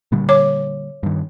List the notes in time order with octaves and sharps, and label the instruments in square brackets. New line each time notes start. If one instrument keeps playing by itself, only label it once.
[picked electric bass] A#2 D3 G3
[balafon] C#5 D6
[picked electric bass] G2 D#3